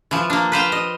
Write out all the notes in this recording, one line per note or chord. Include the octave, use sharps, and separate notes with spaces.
E3 F3
A#3 D4
B4 C5 F5 G5
D#5